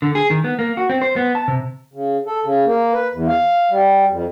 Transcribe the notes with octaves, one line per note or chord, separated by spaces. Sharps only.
D3
G#4
D#3
B3
A#3
F#4
C4
C5
B3
A5
C3
C#3
A4
C#3
A#3
B4
E2
F5
G3
F2